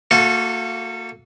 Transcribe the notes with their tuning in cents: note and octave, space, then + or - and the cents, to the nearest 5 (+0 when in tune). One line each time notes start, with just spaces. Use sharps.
A#3 -35 F#4 -35 A4 +0